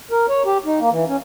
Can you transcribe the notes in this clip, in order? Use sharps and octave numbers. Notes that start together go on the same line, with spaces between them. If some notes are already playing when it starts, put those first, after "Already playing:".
A#4
C#5
G4
D#4
A#3
E3
C#4